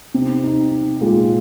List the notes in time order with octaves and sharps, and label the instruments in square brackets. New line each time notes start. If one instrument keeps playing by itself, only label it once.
[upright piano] C3 [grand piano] D#4
[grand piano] D#4
D#4
[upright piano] A#2 [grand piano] G#3